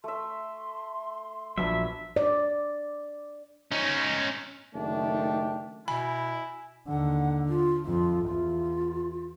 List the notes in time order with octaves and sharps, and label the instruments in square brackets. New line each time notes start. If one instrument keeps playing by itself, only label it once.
[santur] A3 E5 [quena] C6
[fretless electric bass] A#1 F3 F#3 [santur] B3 D4 A5 [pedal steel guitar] E5
[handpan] D5
[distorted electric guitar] C#4 D#4
[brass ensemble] F#1 D#3 A3 D4 G4
[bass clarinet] B2 [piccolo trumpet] E4 [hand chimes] G#5 [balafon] B5
[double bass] D#2 D3 [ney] F#5
[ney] F4
[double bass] F2 [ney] F4
[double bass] E2 [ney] F4